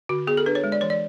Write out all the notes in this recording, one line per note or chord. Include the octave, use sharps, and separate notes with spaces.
D3 F#4
B3 G#4
A4
D4 B4
C#5
G#3
D5
E3 C#5
D5